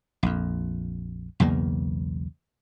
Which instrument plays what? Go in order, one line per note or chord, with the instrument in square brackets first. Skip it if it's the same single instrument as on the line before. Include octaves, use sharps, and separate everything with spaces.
[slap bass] A#1 F2
B1 E2 C#3 A#3